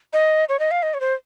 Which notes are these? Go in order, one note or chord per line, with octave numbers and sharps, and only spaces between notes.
D#5
C#5
D#5
F5
D#5
C#5
C5